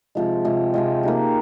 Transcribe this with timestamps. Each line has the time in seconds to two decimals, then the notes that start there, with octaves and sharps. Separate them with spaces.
0.15 C3 F3 G#3
0.45 C3 F3 G#3
0.74 C3 F3 G#3
1.03 A#3 D#4 G4